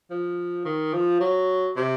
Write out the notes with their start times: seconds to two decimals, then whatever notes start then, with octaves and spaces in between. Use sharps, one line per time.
0.10 F3
0.65 D#3
0.93 F3
1.20 F#3
1.76 C3